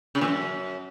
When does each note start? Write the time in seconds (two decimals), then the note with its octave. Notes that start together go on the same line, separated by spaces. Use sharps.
0.15 C#3
0.21 A#2
0.28 F#2